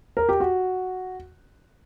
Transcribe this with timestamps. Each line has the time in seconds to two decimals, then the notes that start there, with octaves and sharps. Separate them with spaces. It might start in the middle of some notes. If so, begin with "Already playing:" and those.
0.17 A#4
0.29 G4
0.40 F#4